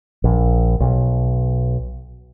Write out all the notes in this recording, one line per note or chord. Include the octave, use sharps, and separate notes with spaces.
A#1
B1